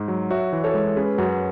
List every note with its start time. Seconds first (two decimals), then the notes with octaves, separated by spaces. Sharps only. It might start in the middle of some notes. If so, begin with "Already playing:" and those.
Already playing: G#2
0.08 F#3
0.30 F#4 C#5 E5
0.53 E3
0.64 A4 C#5
0.74 G#3
0.97 C#4 G#4 B4
1.18 F#2 F#4